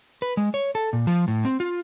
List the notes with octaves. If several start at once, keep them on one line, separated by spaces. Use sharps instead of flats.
B4
G#3
C#5
A4
A#2
F3
A2
C4
F4